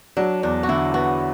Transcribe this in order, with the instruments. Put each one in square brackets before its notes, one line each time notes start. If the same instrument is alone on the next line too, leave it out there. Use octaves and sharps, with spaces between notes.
[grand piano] F#3 [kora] D4
[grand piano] E2 [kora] D4
[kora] F#4
[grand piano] D3 [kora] E4
[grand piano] B3 [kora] F#4